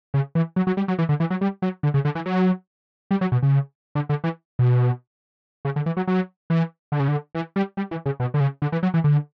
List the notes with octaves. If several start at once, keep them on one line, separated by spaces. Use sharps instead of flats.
C#3
E3
F#3
F#3
G3
F#3
E3
D3
E3
F#3
G3
F#3
D3
C#3
D3
E3
F#3
G3
F#3
B2
C#3
D3
D3
E3
B2
C#3
D3
E3
F#3
F#3
E3
D3
C#3
D3
E3
G3
G3
E3
C#3
B2
D3
C#3
D3
E3
F#3
E3
D3